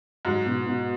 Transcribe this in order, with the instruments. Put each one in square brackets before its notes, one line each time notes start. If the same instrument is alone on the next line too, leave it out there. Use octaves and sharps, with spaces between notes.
[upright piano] G#2 [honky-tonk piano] F#3
[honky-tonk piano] B2
B2